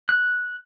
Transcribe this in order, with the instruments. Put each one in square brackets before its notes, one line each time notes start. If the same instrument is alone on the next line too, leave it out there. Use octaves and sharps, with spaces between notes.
[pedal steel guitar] F#6